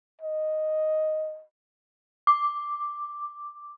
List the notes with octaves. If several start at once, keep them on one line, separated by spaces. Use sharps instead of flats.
D#5
D6